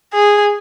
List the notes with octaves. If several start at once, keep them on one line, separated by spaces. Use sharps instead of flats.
G#4